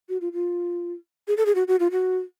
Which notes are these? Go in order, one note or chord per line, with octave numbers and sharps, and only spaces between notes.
F#4
F4
F4
G#4
A4
G#4
F#4
F#4
F4
F#4